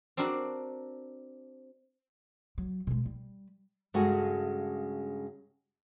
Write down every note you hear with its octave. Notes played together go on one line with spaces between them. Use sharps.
C4 D4 F#4 A#4
F#3
B2 G#3
G3
G2 C#3 G#3 F#4 G#4 A4